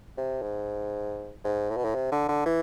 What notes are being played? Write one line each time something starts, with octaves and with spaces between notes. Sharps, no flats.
C3
G#2
G#2
A2
B2
A2
C3
D3
D3
E3